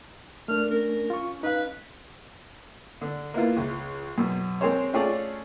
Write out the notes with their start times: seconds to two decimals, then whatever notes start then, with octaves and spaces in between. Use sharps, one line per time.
0.48 A3 D4 A#4 F6
0.71 C#4 A#4
1.10 F4 C#6
1.43 D#4 B4 F5
3.01 D3
3.34 A#3 B3 E4 F4
3.57 C#2
4.18 F#2 B2
4.61 G#3 C4 G#4 A#4 C5 C#5
4.93 A3 C#4 F4 G#4 A4 D5